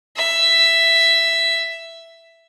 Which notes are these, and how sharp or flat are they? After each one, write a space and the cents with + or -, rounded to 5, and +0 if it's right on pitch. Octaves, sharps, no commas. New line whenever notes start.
E5 +5